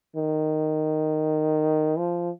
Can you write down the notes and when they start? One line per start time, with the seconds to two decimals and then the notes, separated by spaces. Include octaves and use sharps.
0.16 D#3
1.98 F3